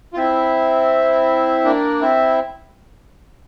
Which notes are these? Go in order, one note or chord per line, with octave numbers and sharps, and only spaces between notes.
F4
C4 E4
A#3 D4
C4 E4